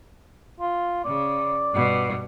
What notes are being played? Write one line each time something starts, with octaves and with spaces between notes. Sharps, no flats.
F4
C#3 D5
G2 B2